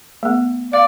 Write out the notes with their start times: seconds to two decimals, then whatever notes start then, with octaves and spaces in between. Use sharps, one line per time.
0.23 A3 B3
0.73 D5 F5